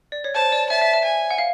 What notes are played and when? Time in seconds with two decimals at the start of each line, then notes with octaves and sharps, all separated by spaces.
0.12 D5
0.24 C#5
0.35 C5 A5
0.52 D5
0.69 E5 A5
0.81 E5
0.94 E5
1.04 G#5
1.31 F#5
1.38 F5